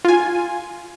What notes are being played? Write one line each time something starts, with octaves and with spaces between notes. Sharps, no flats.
F4 G#5